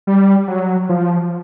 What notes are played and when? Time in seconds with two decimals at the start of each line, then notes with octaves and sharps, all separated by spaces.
0.07 G3
0.48 F#3
0.89 F3